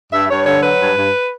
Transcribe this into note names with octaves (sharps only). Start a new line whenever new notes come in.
G2 E5
G2 C#5
D3 C#5
F#3 B4
G2
G2